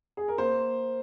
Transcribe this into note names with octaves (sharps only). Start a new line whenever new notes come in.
G#4
A#4
A#3 C5